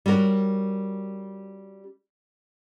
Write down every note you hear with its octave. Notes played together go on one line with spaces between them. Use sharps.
G3 C#4 F#4 A#4